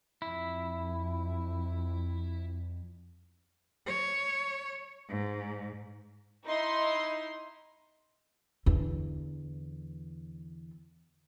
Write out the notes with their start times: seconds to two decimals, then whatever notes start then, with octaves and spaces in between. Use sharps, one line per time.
0.22 F2 E4
3.86 C#5
5.09 G#2
6.45 D#4 E4 C6
8.66 E2 D3